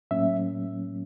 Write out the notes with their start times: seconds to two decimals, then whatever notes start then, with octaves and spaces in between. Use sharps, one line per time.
0.11 A2 F#3 A#3 C#4 E5